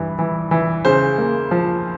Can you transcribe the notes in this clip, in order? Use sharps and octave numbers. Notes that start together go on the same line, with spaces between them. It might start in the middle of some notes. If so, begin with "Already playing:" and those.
Already playing: G2 E3
E3
E3
C#3 C5
A#3
F3